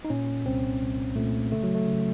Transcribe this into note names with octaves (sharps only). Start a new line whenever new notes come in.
D#4
A#2 C#4
C2 C4
C2
A#2 A3
C#3 A3
F#3
A3
C#3